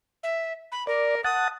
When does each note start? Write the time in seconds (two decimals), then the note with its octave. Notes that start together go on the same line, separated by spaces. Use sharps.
0.23 E5
0.72 B5
0.87 A#4 D5
1.24 F#5 A5 D#6